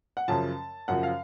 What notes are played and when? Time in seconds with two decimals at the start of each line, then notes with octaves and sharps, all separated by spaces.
0.17 F#5
0.28 F#2 C#3 F3 A5
0.88 F#2 C#3 F3 F#5
1.03 F5